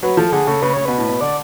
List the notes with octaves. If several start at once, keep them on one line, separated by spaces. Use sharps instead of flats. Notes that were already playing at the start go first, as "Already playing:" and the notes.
F#3 B4
F3 A4
A4
D3 G#4
C#3 A4
C#3 B4
C#3 C#5
B2 B4
A2
B2
D3 D5